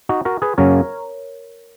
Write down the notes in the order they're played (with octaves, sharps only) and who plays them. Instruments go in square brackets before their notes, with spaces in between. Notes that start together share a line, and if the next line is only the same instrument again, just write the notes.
[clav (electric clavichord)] D#4 F#4
F#4 A#4
G#4 B4
F#2 C#3 F#3 A#3 C#4 A#4 C#5